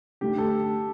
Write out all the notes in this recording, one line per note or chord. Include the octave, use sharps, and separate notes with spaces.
D3 A3 D4 G4
A4